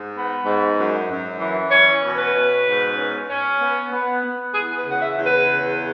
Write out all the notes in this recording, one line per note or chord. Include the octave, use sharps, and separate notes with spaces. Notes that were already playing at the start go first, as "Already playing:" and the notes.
Already playing: G#2
B3
G#2
F#2
F#2
E3
C#4 C#5
B2
B4
B2
G#2
C#4
C#4
B3
B3
B3
E2 G#4
B4
C#3 F#5
E5
E2
B4
C#3